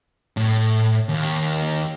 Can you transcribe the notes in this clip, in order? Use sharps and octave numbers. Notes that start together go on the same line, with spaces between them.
A2
D#2